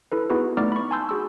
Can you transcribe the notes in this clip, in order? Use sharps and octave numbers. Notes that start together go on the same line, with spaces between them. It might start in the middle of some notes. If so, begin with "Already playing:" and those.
E4 A4 B4
B3 D#4 E4 F#4 G#4 B4
A3 B3 D#4 D5 D6 F6
B5 C#6
G#5 A5 C6 E6 G6
F#4 G#4 E6